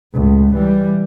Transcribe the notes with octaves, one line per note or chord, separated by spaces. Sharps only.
C#2 A2
E3 G3